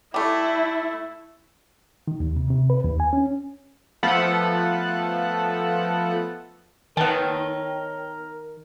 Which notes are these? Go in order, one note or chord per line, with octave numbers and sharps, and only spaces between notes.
G3 A3 E4
D#3
D#2
C3
C3
B4
D#2
G#5
C#4
F3 A3 B3 A4 F#5
D#3 B3 A#4 C#5 G5 A5